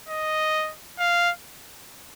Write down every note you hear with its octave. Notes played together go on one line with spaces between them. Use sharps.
D#5
F5